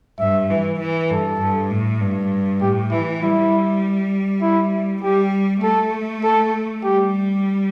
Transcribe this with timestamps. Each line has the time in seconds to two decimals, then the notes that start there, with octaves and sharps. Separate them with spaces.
0.19 G2 E5
0.50 E3
0.80 E3
1.10 G2 A4
1.41 G2
1.70 A2
2.01 G2
2.61 A2 G4
2.91 E3 E4
3.21 G3 E4
4.42 E4
5.03 G3 G4
5.63 A3 A4
6.23 A4
6.84 G3 G4